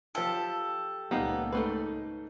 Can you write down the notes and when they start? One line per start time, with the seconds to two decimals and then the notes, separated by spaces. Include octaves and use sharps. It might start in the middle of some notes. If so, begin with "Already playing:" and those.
0.15 F3 F4 G4 A4
1.11 C#2 A#2 G3 A#3 B3 D#4
1.53 G#2 A3 D#4 B4